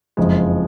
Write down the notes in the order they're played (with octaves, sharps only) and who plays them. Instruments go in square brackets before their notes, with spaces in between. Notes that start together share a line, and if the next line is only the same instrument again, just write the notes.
[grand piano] F#1 F2 F3 G#3